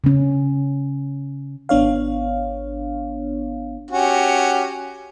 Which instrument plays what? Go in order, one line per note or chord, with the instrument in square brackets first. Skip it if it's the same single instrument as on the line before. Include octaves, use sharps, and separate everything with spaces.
[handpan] C#3 C#4
[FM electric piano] G#1 B3 D4 C#5 F5
[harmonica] C#4 F#4 G4